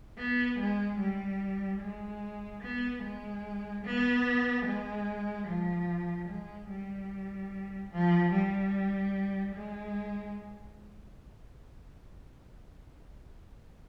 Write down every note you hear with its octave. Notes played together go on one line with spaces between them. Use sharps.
B3
G#3
G3
G#3
B3
G#3
B3
G#3
F3
G#3
G3
F3
G3
G#3